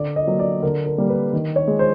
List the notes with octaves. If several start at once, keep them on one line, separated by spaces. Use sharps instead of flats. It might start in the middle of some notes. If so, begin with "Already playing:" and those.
Already playing: D3 D5
D#5
F#3 A#3
D5
D3 A#4
A#4
G3 A#3
B4
D#3
C#5
G#3
C5